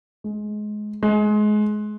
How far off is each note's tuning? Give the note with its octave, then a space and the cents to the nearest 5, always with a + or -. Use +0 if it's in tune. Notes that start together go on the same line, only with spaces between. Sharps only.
G#3 +20
G#3 +25